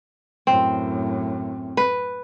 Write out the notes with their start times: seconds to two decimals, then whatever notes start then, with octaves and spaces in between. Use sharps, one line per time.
0.47 F#2 A2 C4
1.77 B4